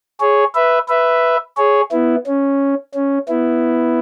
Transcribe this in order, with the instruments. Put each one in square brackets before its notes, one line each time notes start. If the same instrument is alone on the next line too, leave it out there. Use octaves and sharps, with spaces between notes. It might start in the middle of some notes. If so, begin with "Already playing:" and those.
[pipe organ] G#4 C#5
B4 E5
B4 E5
G#4 C#5
B3 E4
C#4
C#4
B3 E4